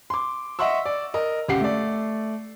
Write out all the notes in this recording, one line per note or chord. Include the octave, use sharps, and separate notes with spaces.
C6 D6
D#5 E5 F#5 C6 C#6 E6
D5
A#4 D#5
C#2 G4 F#5 C7
A3 D5